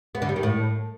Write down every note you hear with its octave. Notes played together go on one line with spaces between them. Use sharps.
B3
D3
G3
D#3
A2